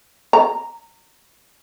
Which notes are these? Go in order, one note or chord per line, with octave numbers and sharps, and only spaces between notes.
A#5